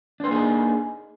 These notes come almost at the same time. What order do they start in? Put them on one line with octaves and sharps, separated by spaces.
D4 C5 A#3 G#4 D#4